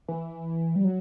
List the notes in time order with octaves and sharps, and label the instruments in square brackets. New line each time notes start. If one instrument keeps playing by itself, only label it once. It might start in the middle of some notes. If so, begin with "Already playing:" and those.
[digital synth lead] E3
G3
F#3